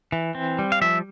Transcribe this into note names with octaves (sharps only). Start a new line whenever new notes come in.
E3
C4
G3
F5
F3 E5